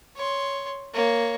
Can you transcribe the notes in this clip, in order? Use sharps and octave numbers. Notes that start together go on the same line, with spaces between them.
C#5 C6
A#3 C#5